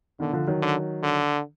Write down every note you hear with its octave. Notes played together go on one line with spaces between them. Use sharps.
B2 D3 D#3
D3 F3
D#3 F#3
D3
D3